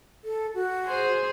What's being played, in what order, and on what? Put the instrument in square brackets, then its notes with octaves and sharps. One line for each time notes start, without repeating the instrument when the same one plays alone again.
[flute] A4
F#4
[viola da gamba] G#4 C5